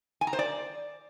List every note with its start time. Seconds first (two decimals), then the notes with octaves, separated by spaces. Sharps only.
0.21 G#5
0.27 A#5
0.33 C5
0.39 D5